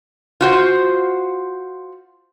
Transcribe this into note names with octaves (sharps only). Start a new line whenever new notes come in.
F4 F#4 C5